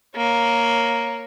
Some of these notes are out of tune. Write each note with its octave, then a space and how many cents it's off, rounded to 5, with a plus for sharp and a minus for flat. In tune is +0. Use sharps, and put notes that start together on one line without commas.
A#3 +0 C#5 +0